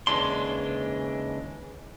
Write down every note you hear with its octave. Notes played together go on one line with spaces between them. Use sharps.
D#2 C#3 E3 G#3 D4 C6